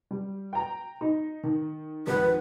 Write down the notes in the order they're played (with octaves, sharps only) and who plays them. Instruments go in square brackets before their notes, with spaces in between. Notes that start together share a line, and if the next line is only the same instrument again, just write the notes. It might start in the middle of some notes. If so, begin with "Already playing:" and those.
[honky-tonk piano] G3
G5 A#5
D#4
D#3
[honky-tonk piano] G#1 F2 [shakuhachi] B4